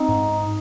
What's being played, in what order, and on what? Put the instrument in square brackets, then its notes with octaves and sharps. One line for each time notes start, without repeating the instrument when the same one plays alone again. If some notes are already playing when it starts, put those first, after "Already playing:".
Already playing: [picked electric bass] C4 [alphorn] D#4
[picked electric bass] G#2